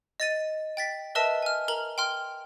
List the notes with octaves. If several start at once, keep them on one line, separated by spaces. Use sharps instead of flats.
D#5 A6 D#7
G5 A6 B6
A#4 B4 D#5 E5 A5 E6
G#5 F6
A#4 A#5 F#7
G5 C6 F6